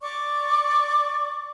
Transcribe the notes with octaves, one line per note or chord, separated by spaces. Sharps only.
D5 C#6 D6